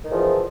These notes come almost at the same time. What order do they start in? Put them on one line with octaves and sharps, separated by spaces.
D#3 E2 F3